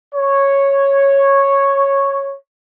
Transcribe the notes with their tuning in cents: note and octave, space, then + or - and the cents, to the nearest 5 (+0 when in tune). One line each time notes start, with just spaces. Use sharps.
C#5 -5